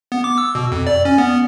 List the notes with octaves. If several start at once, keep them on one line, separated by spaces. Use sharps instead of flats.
B3
D6
E6
B2
F2
D5
C#4
B3